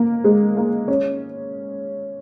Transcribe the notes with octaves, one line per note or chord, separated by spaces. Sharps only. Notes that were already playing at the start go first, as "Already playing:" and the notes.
Already playing: A#3
G#3
A#3
C#4